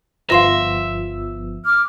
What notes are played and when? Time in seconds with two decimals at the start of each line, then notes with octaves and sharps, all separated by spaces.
0.30 G1 F3 B3 E5 F5 C6 A#6
1.65 D6 F6